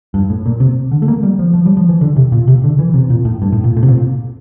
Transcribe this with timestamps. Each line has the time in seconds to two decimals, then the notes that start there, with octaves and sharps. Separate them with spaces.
0.14 G2
0.30 A2
0.46 A#2
0.60 C3
0.92 D3
1.02 A3
1.08 A#3
1.23 G3
1.39 F3
1.54 F3
1.66 G3
1.77 F3
1.89 E3
2.01 D3
2.16 C3
2.32 A#2
2.48 C3
2.64 D3
2.79 E3
2.94 C3
3.10 A#2
3.25 A2
3.42 G2
3.52 A2
3.64 A#2
3.76 A2
3.83 C3
3.88 A#2